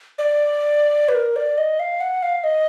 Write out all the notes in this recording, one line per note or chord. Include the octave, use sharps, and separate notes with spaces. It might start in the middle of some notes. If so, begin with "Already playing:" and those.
D5
B4
A#4
D5
D#5
F5
F#5
F5
D#5